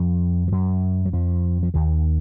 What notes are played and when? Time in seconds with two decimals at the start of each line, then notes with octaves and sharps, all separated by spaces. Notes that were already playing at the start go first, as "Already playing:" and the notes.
Already playing: F2 F3
0.48 F3
0.52 F#2 F#3
1.06 F#3
1.13 F2 F3
1.63 F3
1.74 D#2 D#3